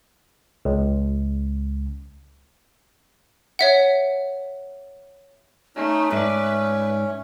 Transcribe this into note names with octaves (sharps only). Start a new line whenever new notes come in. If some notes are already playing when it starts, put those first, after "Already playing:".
C#2
C#5 E5 F#5
A3 C#4 D#4
G#2 B4 D5 E5